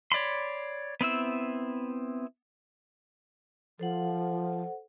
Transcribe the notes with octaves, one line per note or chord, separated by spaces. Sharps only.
C#5 D5 B5 C6
B3 C4 E4 E6
F3 A4 C5 F#5